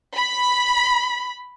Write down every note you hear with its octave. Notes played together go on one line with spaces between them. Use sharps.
B5